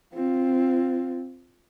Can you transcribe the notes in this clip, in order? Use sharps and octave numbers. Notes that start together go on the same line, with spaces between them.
C4 F4